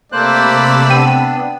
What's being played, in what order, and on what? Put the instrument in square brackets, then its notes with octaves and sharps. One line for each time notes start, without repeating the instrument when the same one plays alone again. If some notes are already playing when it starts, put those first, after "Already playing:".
[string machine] C3 B5 E6 [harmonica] A3 D5 [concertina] A#3 C5 F#6
[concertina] B3 D4 [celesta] G5 D#7